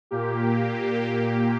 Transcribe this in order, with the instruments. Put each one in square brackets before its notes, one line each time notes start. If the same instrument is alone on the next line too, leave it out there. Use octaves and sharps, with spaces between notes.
[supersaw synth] A#2 A#3 G4